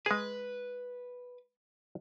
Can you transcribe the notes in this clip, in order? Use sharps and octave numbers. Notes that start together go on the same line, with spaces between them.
G#3 G#4 B4